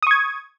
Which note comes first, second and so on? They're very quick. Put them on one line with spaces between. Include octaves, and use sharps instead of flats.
D#6 C#6 G#6